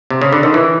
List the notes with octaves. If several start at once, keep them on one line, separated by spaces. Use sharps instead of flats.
C3
C#3
D3
D#3
E3